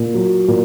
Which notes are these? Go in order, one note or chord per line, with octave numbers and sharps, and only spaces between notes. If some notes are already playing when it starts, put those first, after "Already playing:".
Already playing: A#2
F#3
A#2